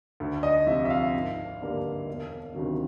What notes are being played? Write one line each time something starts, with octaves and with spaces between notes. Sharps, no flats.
D2
D#5
C3 F3 E5
E5
F5
G#1
G2 D3 G3 A#3
E1
D2 C3 D#3 F#3